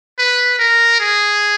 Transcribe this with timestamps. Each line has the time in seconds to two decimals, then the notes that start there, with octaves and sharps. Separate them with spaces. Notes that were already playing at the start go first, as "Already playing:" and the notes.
0.19 B4
0.59 A#4
1.00 G#4